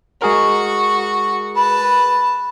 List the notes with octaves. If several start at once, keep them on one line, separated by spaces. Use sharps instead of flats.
G#3 F#4 G#4 A#4 C#6
B4 A5